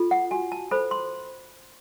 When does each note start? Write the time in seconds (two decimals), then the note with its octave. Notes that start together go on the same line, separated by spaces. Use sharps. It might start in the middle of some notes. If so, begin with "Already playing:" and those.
Already playing: F4 A4
0.11 F#5
0.31 F#4 G#5
0.52 A5
0.71 A4 C5 B5
0.91 C6